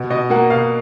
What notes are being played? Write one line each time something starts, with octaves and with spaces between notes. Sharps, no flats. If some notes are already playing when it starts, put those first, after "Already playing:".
Already playing: B2
B2 D#5
A#3 F#5
B2 F5